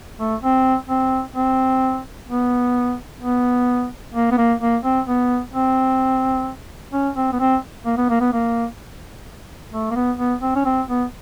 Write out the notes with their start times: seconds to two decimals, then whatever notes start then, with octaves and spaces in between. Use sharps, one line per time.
0.19 A3
0.43 C4
0.89 C4
1.36 C4
2.29 B3
3.21 B3
4.14 A#3
4.31 B3
4.38 A#3
4.61 A#3
4.84 C4
5.07 B3
5.54 C4
6.93 C#4
7.16 C4
7.32 B3
7.40 C4
7.86 A#3
7.97 B3
8.10 A#3
8.21 B3
8.33 A#3
9.72 A3
9.91 A#3
9.96 B3
10.18 B3
10.41 C4
10.55 C#4
10.65 C4
10.88 B3